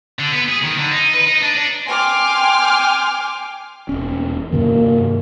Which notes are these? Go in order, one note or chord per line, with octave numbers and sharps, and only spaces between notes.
D3
B3
G#4
D#3
D3
D#4
B4
D#4
D4
D4
G5 G#5 C6 D6 F6
E1 C#4
G2 C3 D#3 A#3